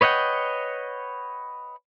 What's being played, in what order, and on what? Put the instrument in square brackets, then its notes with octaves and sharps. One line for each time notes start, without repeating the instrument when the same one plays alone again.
[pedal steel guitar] B4 C#5 D#5 F#5 G5